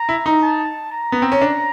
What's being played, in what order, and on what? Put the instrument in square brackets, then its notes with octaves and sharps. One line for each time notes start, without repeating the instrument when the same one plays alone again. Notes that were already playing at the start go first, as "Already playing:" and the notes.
Already playing: [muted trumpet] A#5
[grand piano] E4
D#4
[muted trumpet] A5
A#5
[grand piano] B3
C4
C#4
D4